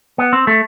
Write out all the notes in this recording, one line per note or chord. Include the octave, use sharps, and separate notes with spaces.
B3
C4
A3